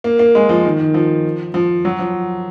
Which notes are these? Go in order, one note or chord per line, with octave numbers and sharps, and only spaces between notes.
A#3
A#3
G#3
F3
D#3
D#3
F3
F3
F#3
F3